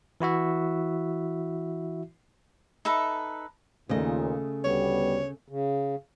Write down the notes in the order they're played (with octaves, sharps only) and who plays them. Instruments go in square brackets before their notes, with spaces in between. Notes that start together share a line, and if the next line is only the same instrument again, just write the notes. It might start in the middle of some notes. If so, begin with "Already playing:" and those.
[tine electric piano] E3 E4 F#4 E5
[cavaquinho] D#4 A4 B4 E5
[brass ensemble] D#2 A#2 [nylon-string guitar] C#3 A3 D#5
[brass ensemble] D2 G3 B3 [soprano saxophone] C#5
[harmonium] C#3